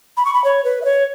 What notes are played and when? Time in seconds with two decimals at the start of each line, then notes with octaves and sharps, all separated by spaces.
0.17 B5
0.25 C#6
0.34 B5
0.44 C#5
0.65 B4
0.82 E5
0.85 C#5